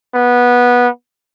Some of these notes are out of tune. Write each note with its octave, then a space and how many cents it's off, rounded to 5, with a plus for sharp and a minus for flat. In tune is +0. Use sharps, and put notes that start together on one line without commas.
B3 -15